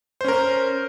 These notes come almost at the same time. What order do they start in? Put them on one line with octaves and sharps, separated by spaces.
C5 C#4 A#4